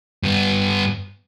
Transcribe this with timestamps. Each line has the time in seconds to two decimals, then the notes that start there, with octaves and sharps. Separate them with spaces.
0.23 G2 B3